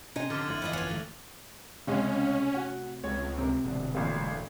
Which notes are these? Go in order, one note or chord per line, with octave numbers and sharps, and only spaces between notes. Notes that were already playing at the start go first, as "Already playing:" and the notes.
C3 C#4 D#4 G#6 D#7
D3 F3 D6 F6 A6
F#1 A2 F#6 F#7
G1 F2 E3 F4 B4 D5 D#5
F2 B3 C#4 F4
D#3 F#3 A3
C#2 A2 C3 G#3 C#4
F#4
C#2 C#5
C3 C4 A#4
E1 D2 B2
A1 A#2